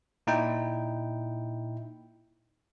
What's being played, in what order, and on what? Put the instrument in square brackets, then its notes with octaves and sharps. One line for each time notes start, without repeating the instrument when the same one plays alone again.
[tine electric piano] A#2 D#4 E4 G5